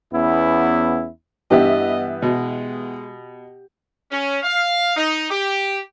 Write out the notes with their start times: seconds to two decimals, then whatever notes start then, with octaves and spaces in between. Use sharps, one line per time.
0.13 E2 B3 C#4 E4
1.51 G2 E3 B3 G4 D#5 E5
2.22 B2 G#3
4.11 C#4
4.43 F5
4.96 D#4
5.31 G4